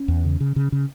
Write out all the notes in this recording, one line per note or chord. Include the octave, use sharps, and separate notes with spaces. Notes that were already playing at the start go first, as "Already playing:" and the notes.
Already playing: C#4
E2
C#3
C#3
C#3
C#3